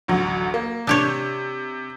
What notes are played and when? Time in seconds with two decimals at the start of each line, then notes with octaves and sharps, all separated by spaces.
0.08 A1 D2 F#3
0.54 A#3
0.87 C3 D4 G4 C#5